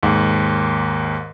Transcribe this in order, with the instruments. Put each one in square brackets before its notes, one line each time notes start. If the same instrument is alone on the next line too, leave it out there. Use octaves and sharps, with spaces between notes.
[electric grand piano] D#2 G#2